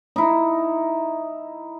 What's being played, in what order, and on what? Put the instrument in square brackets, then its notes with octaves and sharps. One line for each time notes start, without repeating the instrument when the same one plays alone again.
[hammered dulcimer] D#4 E4